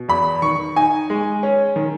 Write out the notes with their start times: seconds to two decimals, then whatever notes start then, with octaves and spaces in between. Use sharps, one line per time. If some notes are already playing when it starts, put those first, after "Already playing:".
Already playing: B2
0.08 E2 B5
0.42 D#3 C#6
0.76 D#4 G#5
1.10 G#3
1.43 C#4
1.76 D#3